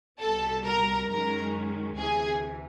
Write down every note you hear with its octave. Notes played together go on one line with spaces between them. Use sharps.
C2 B2 G3 A4 A5
A#4 A#5
F#2 D#3 G#3 C#4 A#4 A#5
D2 C3 E3 G#4 G#5